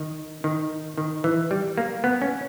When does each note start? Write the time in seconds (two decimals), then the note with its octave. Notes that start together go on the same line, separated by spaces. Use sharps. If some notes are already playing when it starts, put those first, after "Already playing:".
Already playing: D#3
0.44 D#3
0.98 D#3
1.24 E3
1.51 G3
1.78 A#3
2.04 B3
2.22 C#4